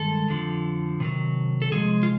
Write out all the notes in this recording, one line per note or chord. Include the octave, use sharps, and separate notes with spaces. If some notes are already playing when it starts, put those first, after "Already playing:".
Already playing: G2 D#3 G#3 A4
F2 D3 F3
C3 D#3 F#3
A4
C3 F3 G#3 G#4
F4